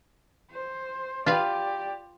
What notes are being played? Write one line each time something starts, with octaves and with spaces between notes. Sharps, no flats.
C5
F4 G4 B4 D5 F5